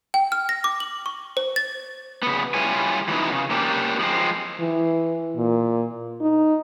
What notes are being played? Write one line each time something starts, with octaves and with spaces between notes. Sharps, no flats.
G5
F6
A#6
D6
F#7
C#6
C5
A6
C#3 B3
G3 E4 F4 C#5 G#5
E3 F#3 A#3 B3 D#4
C#3
A#3 C#4 D4 G4
F3 G#3 A3 C4
E3
A#2
D#4